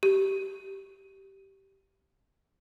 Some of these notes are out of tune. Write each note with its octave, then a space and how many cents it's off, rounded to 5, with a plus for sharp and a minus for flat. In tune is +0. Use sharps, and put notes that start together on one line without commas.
G4 -15